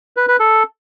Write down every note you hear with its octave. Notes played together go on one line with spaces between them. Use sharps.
B4
B4
A4